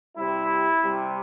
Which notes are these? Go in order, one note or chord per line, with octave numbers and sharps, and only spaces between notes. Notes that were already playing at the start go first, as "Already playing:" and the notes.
C3 G3 E4
C3 G3